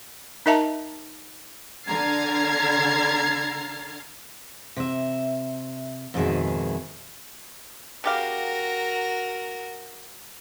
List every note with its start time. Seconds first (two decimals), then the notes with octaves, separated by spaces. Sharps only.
0.46 D#4 A#4 D#5 E5 A5 A#5
1.87 D3 A#5 F6 G#6 A6 C7
4.76 C3 E5
6.14 F2 G#2 B2 D#3 G#4 E5
8.04 C#3 F#4 G4 A#4 F5